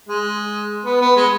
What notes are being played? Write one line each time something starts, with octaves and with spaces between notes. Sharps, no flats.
G#3
B3
B3
G#3